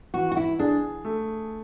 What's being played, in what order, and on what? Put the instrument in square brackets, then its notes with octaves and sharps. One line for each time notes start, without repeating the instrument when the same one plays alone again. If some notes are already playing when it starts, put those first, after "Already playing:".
[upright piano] E3 [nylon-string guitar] F#4
[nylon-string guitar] F#4
E4
[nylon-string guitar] D4 [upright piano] G#4
[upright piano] A3